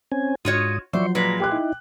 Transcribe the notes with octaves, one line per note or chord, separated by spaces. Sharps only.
C4 C#4 G#5
G#2 F4 F#4 C#5 D#6
F3 F#3 C5 D5 E5 C#6
A#2 G#3 B4 A#5
G4 G5 D6 F#6
D#4 E4